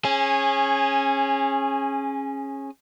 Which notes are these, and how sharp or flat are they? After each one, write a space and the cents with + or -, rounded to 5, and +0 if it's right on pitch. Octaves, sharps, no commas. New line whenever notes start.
C#4 -20 G#4 +0